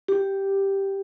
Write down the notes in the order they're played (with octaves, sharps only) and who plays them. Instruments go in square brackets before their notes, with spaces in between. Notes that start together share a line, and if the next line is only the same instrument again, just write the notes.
[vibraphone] G4